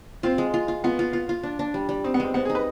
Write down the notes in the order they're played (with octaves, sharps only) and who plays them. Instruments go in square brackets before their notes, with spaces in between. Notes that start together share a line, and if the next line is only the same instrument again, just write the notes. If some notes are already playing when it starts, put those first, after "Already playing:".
[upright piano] C4 [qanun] F4
[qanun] G#3
F4
F4
[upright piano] B3 [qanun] F4
[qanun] F4
F4
F4
D4
D4
G3
G3
[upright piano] C4 [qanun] D#4
[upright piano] B3
[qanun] G#3 [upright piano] C4
[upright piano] B3 [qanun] C4
[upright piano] G#4
[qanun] D#4
[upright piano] B4